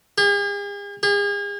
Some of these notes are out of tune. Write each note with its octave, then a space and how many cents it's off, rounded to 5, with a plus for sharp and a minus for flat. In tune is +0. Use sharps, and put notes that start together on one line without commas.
G#4 -45
G#4 -40